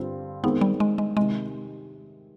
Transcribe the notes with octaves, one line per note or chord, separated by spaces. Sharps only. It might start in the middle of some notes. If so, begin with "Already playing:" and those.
Already playing: G2 D3 G3 C4 F4
D#3 G#3 B3 C4
G3
G#3
G#3
C3 D#3 G#3